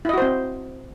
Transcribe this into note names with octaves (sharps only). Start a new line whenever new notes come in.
C4 E4 F#4 C5 D#5